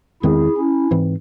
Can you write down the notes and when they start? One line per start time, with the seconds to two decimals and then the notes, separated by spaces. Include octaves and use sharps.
0.23 E2 D#3 G#3 C4 E4 G#4
0.57 C#4 E4
0.91 G#2 E3 C4